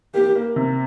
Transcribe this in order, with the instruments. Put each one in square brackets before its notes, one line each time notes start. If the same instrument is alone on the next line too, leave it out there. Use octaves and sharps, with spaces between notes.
[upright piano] A#3 [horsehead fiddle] G4
[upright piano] A#3
C3